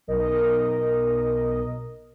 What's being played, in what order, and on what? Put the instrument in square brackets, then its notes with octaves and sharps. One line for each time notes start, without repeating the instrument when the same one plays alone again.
[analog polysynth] B1 A#4 D#5